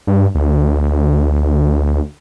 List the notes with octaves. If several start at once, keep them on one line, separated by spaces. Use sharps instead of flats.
G2
D2